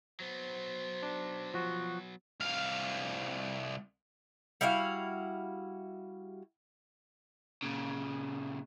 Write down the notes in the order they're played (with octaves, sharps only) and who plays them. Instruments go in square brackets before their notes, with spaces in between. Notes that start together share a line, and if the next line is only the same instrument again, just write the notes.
[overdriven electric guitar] F#3 B3 [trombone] C5
[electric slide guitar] D4
F3 F#4
[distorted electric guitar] C2 F5
[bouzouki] G3 E4 F#4 F5
[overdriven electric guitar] A#2 C#3